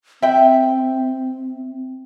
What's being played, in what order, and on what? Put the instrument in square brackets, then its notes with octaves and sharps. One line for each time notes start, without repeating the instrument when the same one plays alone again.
[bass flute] C4 [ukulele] E5 G5